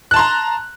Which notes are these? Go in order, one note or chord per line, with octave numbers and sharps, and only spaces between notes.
A5 A#5 C6 F#6